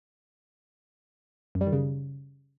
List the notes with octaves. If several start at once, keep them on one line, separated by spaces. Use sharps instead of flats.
F#2
G3
D#3
C#3